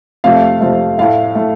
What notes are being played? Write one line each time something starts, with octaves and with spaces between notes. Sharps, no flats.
F2 C3 F3 A3 F5
F2 C3 F3 A3
A2 A3 F5
A2 A3